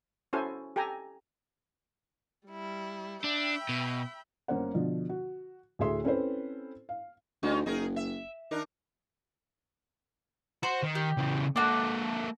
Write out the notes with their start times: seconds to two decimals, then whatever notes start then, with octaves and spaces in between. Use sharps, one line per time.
0.33 C#4 E4 F#4 A4 C5 G#5
0.76 G4 A4 G5 G#5 A#5
2.46 G3 E4
3.24 D4 E5 G5 B5
3.69 B2
4.48 G1 A#3 C#4 C5 F#5
4.74 B2 D3 F3
5.09 F#4
5.79 D2 A2 A3 G#4 E5 C6
6.04 C4 C#4 E4 A4 B4 C5
6.89 F5
7.43 D2 G3 C#4 D#4
7.66 F#1 D#4 G#4 A#4
7.96 E5
8.51 D#3 D4 D#4 A#4
10.63 F#4 C5
10.83 D#3
10.95 G4
11.17 C#3 E3
11.56 A#3 D4 F#4 A4